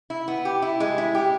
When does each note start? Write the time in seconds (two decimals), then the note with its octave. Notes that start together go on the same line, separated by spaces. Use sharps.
0.10 E4
0.28 B3
0.45 G4
0.62 E4
0.80 G#3
0.98 E4
1.15 G4